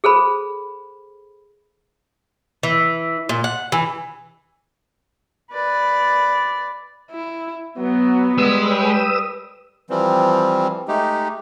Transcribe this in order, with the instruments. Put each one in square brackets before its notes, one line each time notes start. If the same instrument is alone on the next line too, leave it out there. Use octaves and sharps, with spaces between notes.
[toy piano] G#4 A4 C5 B5
[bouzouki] E3
A#2
F#5
E3
[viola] B4 D5
[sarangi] E4
[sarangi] F#3 [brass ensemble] B3
[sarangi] G3 [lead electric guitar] G#3 [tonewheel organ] B4 D#6 E6
[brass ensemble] C#5 G5
[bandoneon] E3 F3 G3 C4
G#3 A3 D#4 G4